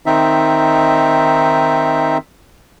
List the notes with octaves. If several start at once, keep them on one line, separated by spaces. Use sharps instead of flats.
D#3 C4 D#4 E5